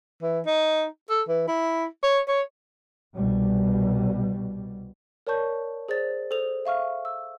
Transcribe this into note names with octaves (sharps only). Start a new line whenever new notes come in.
E3
D#4
A4
E3
E4
C#5
C#5
C2 B2 G3
A#4 C#5 D5 A5 C#6 G6
G#4 C5 D5 A6
A4 C5 D#6 F7
E5 F5 C#6 F6
E6